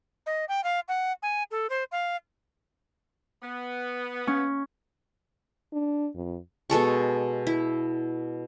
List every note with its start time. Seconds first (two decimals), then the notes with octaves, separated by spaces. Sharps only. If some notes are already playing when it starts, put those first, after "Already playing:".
0.26 D#5
0.48 G5
0.64 F5
0.88 F#5
1.22 G#5
1.51 A4
1.70 C5
1.92 F5
3.42 B3
4.27 C#4
5.73 D4
6.15 F2
6.70 B2 G#3 A4 C#6
7.47 E4